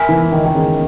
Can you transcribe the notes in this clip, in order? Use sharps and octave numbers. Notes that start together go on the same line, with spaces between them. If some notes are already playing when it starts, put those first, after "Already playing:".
Already playing: A#4 E5 G#5 B5
E3
D#3
D#3
C#3